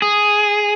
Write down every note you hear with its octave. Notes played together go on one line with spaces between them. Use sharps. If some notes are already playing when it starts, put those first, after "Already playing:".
G#4